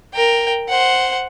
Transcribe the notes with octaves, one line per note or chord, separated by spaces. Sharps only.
A#4 G5
C5 F#5